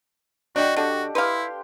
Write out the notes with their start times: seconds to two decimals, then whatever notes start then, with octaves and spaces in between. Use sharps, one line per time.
0.56 D4 F#4 D5 D#5 F#5 G5
0.76 D3 D4 F#4 G4 A4
1.15 E4 G4 B4 F5 C6